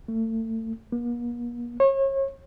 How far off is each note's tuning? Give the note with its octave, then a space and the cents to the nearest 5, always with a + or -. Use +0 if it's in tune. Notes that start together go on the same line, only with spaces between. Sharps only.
A3 +35
A#3 +45
C#5 -35